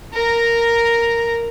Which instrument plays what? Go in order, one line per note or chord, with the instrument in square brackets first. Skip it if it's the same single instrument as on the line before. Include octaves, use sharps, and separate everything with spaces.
[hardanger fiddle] A#4 A#5